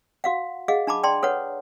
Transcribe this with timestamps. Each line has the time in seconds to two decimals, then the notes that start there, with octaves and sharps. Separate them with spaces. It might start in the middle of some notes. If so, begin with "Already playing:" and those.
0.24 F#4 F5 F#5
0.68 G#4 D#5 F5 F#5
0.87 D4 A5 B5 D6
1.03 D5 G5 A5 C6
1.23 A4 B4 C#5 F#5